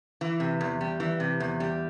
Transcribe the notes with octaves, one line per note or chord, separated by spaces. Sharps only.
E3
C3
E2
G3
E3
C3
E2
G3